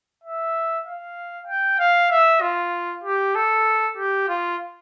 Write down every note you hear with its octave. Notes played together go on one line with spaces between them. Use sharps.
E5
F5
G5
F5
E5
F4
G4
A4
G4
F4